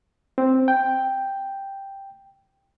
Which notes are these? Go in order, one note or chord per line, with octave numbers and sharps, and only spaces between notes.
C4
G5